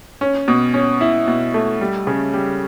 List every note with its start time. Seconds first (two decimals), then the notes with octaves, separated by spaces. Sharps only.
0.21 C#4
0.48 B2
0.74 C#4
1.01 E4
1.28 B2
1.54 A3
1.81 G3
2.07 C#3
2.33 G3